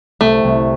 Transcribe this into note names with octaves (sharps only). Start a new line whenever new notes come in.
C2 A3
C2